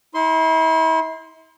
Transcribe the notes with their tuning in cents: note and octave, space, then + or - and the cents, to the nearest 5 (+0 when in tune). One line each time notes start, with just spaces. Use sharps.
E4 -40 C6 +0